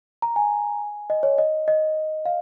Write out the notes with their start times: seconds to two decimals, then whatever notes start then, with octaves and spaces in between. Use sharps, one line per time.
0.22 A#5
0.36 G#5
1.10 D#5
1.23 C#5
1.38 D#5
1.68 D#5
2.26 F5